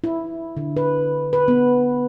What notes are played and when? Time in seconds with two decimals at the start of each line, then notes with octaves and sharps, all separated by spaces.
0.04 E4
0.57 D3
0.77 B4
1.33 B4
1.48 B3